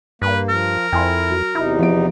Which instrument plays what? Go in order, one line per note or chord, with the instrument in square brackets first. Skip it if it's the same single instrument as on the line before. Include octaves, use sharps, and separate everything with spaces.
[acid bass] G2 [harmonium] A#3 [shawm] B4
[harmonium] F3 [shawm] A#4
[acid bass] F2 [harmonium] E4 [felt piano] G5 G#5 C6
[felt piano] F#3
[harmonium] E2 C3 D#4 [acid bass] E4
[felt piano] F3 B3 D7